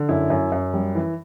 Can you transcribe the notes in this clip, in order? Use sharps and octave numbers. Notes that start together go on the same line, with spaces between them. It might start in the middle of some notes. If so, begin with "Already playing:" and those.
Already playing: D3
F#2 E4
F#2
F#2
G3
E3